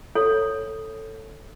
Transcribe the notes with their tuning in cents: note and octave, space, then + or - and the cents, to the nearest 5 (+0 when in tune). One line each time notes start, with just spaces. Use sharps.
A4 +10 C#5 +0